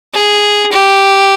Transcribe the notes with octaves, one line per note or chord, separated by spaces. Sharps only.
G#4
G4